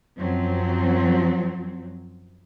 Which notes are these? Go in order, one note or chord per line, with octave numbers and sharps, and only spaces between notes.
F#2 F3 F#3 C4